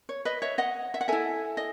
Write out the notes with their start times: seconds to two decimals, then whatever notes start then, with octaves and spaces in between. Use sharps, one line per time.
0.09 C#5
0.25 B4 D#5
0.42 C#5 E5
0.58 D#5 F#5
0.94 E5
1.01 F#5
1.08 E4 A4 E5 G#5
1.57 D#5